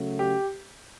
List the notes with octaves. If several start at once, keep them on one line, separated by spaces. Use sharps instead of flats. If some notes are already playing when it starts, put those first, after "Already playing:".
Already playing: C#3 F#3 A3
G4